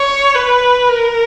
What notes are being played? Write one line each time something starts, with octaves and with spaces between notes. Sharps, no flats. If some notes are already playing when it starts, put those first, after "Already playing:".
Already playing: C#5
B4
A#4